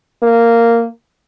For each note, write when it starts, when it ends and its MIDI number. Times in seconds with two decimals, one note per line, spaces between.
0.23 0.85 58